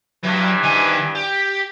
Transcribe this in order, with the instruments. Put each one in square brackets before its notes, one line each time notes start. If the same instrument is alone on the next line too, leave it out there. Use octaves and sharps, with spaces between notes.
[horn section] G2 E3 [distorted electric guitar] F#3
[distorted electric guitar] D#3 G#5
G4